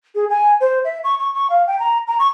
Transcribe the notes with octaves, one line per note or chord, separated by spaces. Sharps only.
G#4
G#5
C5
E5
C#6
C#6
C#6
F5
G5
A#5
A#5
C#6